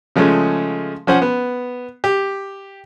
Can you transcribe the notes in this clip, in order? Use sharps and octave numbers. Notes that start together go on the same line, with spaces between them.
C#3 F3 G#3 A3 C#4
F3 C#4 C5 F#5
B3
G4